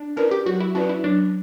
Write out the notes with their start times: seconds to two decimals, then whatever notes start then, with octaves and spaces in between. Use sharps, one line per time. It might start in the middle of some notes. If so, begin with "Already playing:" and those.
Already playing: D4
0.16 C#4 E4 A#4 B4 D5
0.31 G4
0.46 F#3 F#4
0.60 E4
0.75 C#4 E4 F#4 B4 D5
0.89 E4
1.03 F#3 D4